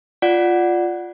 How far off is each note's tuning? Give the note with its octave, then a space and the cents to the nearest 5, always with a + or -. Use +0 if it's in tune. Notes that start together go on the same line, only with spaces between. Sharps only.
F4 +0 D5 +0 F#5 +0